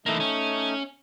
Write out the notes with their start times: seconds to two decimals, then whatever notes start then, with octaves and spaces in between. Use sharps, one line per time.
0.06 E3 A3 A#3 D#4
0.20 C#4